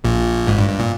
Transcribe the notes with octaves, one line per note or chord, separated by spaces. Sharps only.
A#1 A#2
G#1 G#2
G2
G2
A#2